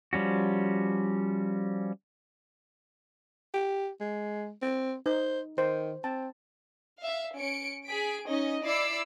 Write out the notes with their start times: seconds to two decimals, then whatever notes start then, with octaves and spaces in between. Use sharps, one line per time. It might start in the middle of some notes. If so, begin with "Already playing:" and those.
0.13 F3 G3 C#4 F#4
3.54 G4
4.01 G#3
4.62 C4
5.06 D#4 C5
5.58 D#3 C5
6.04 C4 A5
7.02 E5 F5
7.37 C#4 C#7 D7
7.85 G#4 B6 D7
8.27 C#4 D#4 D#5
8.63 E4 D5 D6 E6 C7